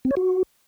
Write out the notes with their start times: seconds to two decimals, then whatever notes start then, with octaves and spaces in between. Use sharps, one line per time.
0.05 C4
0.11 C#5
0.17 F#4